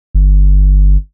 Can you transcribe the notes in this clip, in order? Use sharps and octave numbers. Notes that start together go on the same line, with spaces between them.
G1